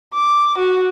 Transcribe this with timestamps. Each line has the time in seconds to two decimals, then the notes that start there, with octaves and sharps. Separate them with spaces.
0.14 D6
0.58 F#4